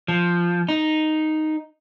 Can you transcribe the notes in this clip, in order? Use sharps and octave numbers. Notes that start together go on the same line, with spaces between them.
F3
D#4